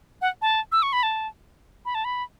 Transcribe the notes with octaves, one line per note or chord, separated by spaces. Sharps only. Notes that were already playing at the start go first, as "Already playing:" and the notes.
F#5
A5
E6
C#6
B5
A5
B5
A5
B5